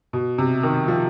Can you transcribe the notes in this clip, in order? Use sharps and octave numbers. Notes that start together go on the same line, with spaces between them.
B2
C3
D#3
F3